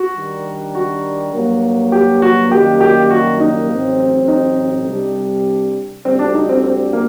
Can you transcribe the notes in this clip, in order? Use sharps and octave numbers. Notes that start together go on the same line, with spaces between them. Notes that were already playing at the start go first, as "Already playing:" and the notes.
Already playing: F#4
D#3 G3 D4 G4 A#4
F#4
G2 F#3 A#3
G4
F#4
F#2 D#3 G3 A#3 G4
G4
F#4
D#4
A1 A2 F#3 C4
D#4
C2 C3 G3 D4
D2 D3 G3 C4
D4
D#4
C4
C4
A#3